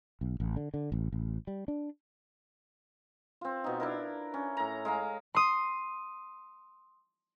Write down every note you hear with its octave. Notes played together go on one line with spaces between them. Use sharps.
B1
A1
D3
D3
A1
A1
G3
D4
C4 F4
B2 D#4
D4 E4 A#4
C#4
A2 A#5
G#3 F5 A#5
C6 D#6